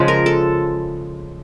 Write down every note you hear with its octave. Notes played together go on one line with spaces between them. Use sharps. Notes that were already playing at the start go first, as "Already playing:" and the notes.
Already playing: C#3 F3 G#3
A#4
A4